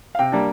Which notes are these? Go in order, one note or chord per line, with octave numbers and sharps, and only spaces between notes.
F5
C3 G5
G3 A#3 D4